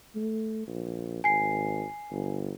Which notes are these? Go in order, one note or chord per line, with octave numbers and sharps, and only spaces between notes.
A3
A#1
G#1 G#5 C7
G1